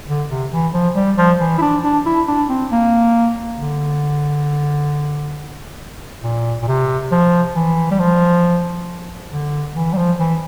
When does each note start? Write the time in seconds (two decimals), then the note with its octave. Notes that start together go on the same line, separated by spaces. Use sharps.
0.08 D3
0.30 C3
0.52 E3
0.74 F3
0.96 G3
1.18 F3
1.40 E3
1.58 E4
1.62 D4
1.84 D4
2.06 E4
2.28 D4
2.50 C4
2.72 A#3
3.60 D3
6.24 A#2
6.62 A#2
6.68 C3
7.11 F3
7.55 E3
7.91 G3
8.00 F3
9.32 D3
9.76 E3
9.93 G3
9.97 F3
10.20 E3